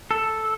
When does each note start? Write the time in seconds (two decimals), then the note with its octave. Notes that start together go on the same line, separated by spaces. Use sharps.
0.11 A4